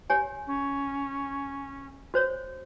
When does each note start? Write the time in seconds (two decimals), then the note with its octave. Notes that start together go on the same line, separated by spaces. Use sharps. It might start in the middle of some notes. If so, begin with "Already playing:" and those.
0.10 G4 C#5 G#5
0.46 C#4
2.14 F#4 C5 C#5